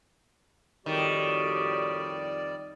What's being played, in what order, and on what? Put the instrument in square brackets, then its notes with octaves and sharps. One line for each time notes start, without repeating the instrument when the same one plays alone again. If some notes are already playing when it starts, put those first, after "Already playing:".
[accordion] F2 G3 D5 [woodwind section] A2 F#4 G4 [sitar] D#3